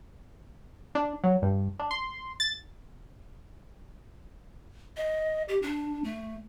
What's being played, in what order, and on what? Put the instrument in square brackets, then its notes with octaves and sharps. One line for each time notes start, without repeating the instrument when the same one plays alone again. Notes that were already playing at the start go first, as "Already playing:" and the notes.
[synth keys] D4
F#3
G2
D4
C6
A6
[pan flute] D#5
G4
D4
A3